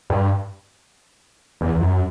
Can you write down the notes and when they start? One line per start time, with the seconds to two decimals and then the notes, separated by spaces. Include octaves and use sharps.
0.10 G2
1.61 E2
1.75 E2
1.81 F#2